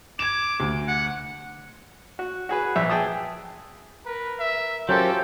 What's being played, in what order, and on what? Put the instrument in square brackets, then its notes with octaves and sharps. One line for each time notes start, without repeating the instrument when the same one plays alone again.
[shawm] D6 [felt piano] G#6 E7
[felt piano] D2
[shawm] F#5
[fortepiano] F#4
F#4 G#4 B4
A#1 E5
G#4 G5 A5 D#6
[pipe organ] A#4 [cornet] B4
[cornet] E5
[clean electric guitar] F#3 C#4 G4 [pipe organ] F4 A#4 C5 [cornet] A4 [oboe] G5